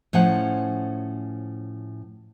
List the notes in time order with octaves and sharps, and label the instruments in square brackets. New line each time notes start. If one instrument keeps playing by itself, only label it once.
[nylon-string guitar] A2 F3 C#4 C5 F#5